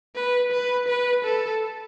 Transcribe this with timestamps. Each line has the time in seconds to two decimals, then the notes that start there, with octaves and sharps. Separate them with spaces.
0.15 B4
0.52 B4
0.88 B4
1.25 A4